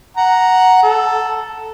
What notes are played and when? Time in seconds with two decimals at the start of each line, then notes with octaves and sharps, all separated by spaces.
0.17 F#5 A#5
0.83 A4